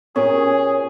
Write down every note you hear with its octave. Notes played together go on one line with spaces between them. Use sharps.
A#2 C#4 G4 G#4 A#4 C#5